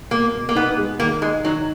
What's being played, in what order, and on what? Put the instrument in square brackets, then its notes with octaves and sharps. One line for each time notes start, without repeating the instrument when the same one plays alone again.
[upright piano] B2 [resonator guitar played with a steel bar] A#3
[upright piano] B2
[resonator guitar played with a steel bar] A#3
[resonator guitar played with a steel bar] B3 [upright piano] D#4
[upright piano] G#3
[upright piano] D#3 [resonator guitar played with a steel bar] A#3
[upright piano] D#3 [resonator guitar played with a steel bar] G#3
[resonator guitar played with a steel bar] F#3 [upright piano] D#4